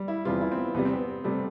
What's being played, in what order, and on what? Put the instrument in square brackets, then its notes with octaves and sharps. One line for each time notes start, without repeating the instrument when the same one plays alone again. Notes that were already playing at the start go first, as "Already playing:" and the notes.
Already playing: [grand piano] G3
E4
[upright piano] E2 C3 G3 [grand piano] F4
[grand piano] E4
C4
B3
[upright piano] E2 C3 G3 [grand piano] B3
[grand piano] C4
B3
[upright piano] C3 G3 [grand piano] A3